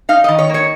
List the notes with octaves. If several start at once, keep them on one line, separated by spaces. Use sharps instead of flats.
D#4 F5
D#3 D#5
C#5
A#3 C#5